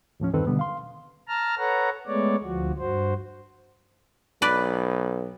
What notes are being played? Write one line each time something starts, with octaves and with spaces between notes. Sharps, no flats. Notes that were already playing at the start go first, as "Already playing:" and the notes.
D#2 A2 F3 C#4
E2 G2 D#3 C4 A4 B4
B2 D3 G3 B3
F5 C6
A5 A#5 F6
A4 B4 C#5 F#5 A#5
G#3 A3 B3 C#5 D5
D2 F3 F#4
G2 F#4 C5
B1 B4 D5